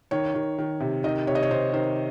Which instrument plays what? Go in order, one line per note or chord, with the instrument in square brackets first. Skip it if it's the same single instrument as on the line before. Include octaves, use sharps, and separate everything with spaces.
[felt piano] D#3 C#5
D#3
D#3
C3
D#3 D#5
C3 C#5
D#5
C#5
C3 C5
D#3 C5